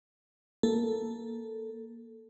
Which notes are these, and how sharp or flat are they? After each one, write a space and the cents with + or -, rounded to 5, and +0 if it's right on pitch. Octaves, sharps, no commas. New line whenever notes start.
A#3 +10 A4 +0